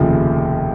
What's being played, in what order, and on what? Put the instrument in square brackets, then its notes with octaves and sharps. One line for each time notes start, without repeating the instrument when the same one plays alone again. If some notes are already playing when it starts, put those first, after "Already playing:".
Already playing: [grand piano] F1 D#2 C#3 F3